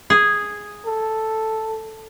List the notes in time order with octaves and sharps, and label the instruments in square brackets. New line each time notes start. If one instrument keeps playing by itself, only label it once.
[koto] G#4
[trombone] A4